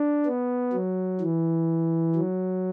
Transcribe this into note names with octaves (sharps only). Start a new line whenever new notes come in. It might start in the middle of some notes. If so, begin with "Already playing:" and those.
Already playing: D4
B3
F#3
E3
F#3